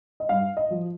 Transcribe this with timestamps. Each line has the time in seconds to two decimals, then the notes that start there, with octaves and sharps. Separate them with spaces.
0.20 D#5
0.29 G2 F5
0.57 D#5
0.70 F3